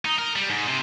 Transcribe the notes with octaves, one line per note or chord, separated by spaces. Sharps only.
D#4
A#4
G3
G#2
C3